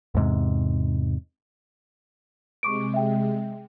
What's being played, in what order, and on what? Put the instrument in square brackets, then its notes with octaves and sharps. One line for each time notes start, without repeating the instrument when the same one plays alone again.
[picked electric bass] E2 G#2 C3
[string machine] C3 G#3 [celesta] C#6 D6 D7
[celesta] E5 G5